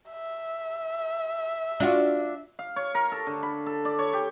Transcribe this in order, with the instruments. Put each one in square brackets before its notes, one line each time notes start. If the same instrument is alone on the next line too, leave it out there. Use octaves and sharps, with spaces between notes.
[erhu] E5
[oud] D4 F4 F#4
[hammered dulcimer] F5
C#5
A#4
A4
D3
B5
A4
D5
C#5
G4